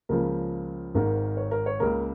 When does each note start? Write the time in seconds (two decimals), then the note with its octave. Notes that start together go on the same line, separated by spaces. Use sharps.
0.09 C#2 C#3 F3 A#3 A#4
0.95 G#1 G#2 D#3 G#3 A#4
1.37 C#5
1.51 A#4
1.66 C#5
1.80 C#2 C#3 A#3 A#4